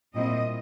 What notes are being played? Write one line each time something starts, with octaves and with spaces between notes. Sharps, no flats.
A#2 G3 C4 E4 D#5